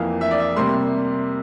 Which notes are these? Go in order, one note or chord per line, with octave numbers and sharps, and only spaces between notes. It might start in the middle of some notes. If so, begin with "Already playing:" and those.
Already playing: F2 E3 A#3 F5
E5
D5
E5
C3 G3 A#3 C6